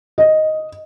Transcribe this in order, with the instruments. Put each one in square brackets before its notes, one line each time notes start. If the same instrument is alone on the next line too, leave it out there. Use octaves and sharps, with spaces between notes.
[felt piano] D#5